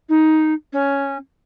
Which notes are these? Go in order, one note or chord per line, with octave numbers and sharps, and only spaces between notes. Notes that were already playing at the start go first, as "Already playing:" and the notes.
D#4
C#4